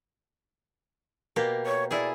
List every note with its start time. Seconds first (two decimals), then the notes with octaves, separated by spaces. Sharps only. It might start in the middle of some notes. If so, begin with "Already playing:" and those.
1.36 B2 A#3 G4
1.66 C#5
1.91 E4 G#4 D5